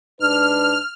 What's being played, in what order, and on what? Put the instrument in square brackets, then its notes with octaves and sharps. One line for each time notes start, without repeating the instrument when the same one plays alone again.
[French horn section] G#2 D4 B4 [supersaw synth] F6